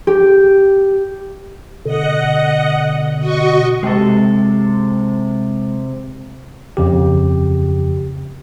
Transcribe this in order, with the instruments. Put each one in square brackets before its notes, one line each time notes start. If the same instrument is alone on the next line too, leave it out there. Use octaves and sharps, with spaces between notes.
[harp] G4
[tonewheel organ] B2 D3 [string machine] D#5 F#5
[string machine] F#4 D#5 C#6
[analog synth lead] C3 [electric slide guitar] G#3 A4
[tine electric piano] F2 C#3 G4